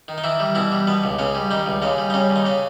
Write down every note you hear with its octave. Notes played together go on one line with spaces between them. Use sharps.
D#3
D#4
D#3 E3 E4
G3
B2 E3 E4
G3
B2 B3
C#2
C#2 C#3 C#4
G3
D#3 G3 D#4
C#2
D#2 C#3 C#4
G3
D#4
C#3 G3 C#4
D#2
D#4
C#3 C#4